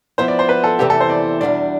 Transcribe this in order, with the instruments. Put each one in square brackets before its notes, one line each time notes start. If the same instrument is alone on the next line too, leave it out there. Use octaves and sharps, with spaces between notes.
[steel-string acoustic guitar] F3 B3 E4 [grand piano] C5
[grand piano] D5
C5
B4
A4
[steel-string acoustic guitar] E2 C3 E3 A3 [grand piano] G4
[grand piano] A4
C5
D5
[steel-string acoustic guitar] E2 B2 G3 D4 [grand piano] D5